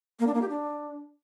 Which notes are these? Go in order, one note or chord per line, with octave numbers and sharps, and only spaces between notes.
A#3
D4
A#3
G4
D4